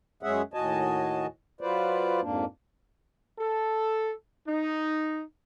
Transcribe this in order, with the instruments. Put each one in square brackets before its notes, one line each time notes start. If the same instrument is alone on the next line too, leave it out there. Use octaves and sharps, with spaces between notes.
[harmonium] F#2 G#3 C#4 G#4 E5 F#5
D#2 A2 F#4 D#5 G#5 A5
F#3 F4 B4 C5 D5
F2 G#2 A#3 D4
[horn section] A4
D#4